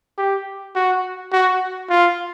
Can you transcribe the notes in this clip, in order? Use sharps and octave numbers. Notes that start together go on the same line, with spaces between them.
G4
F#4
F#4
F4